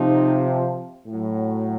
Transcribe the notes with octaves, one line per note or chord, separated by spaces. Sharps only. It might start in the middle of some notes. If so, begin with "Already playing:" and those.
Already playing: C3 F3 D#4
A2 F#3